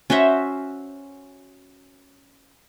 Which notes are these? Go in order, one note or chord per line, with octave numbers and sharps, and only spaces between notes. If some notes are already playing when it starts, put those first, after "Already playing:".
C#4 F#4 C5 E5